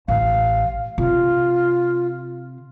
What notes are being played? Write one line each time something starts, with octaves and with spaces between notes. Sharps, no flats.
A1 E3 F5
C3 F4